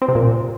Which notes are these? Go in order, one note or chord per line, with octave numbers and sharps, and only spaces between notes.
C4
C3
A#2